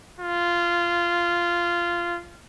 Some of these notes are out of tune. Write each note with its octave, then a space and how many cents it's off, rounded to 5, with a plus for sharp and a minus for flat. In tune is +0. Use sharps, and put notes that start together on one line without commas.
F4 -15